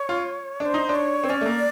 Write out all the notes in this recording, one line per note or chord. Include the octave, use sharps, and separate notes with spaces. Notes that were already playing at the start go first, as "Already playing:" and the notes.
Already playing: C#5
F4
D4 C#5
C5
D#4
D4
C#5
C4
C#4 D5
A3
A#3